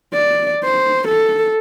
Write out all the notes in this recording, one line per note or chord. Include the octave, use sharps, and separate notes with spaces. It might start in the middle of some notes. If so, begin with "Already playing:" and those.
D5
C5
A4